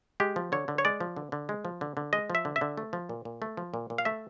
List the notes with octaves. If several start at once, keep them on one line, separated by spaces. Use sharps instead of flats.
G#3 G4
F3
D3 C#5
D3
C#5
G#3 D5
F3
D3
D3
G#3
F3
D3
D3
G#3 D#5
F3
E5
D3
E5
D3
A3
F3
A#2
A#2
A3
F3
A#2
A#2
F5
A3 E5